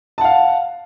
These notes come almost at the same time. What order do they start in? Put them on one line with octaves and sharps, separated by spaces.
A5 F#5 F5